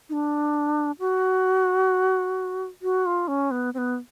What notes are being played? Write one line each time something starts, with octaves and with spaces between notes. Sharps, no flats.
D#4
D4
F#4
F#4
F4
C#4
B3
C4
B3